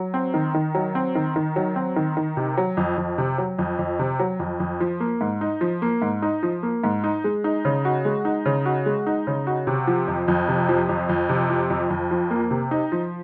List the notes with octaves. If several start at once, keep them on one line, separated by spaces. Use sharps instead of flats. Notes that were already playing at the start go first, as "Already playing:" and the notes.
Already playing: F#3
C4
D#3
D#3
F#3
C4
D#3
D#3
F#3
C4
D#3
D#3
C3
F#3
F2
F2
C3
F#3
F2
F2
C3
F#3
F2
F2
F3
A#3
G#2
D#4
F3
A#3
G#2
D#4
F3
A#3
G#2
D#4
G#3
D#4
C#3
F#4
G#3
D#4
C#3
F#4
G#3
D#4
C#3
F#4
C3
F3
F2
F2
C3
F3
F2
F2
C3
F3
F2
F2
F3
A#3
C3
D#4
F3